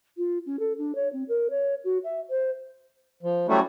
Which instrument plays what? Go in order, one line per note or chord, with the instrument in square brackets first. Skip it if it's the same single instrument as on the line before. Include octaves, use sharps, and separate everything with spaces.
[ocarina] F4
C#4
A4
D4
C#5
C4
A#4
C#5
F#4
E5
C5
[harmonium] F3
[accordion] F#3 G3 A3 [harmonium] C#4 E4 F#4